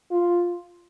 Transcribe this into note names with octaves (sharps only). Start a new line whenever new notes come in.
F4